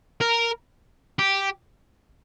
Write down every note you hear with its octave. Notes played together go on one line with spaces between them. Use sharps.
A#4
G4